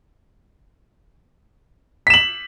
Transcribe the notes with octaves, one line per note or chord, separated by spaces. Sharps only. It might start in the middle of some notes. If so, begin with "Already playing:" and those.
B6 E7 F#7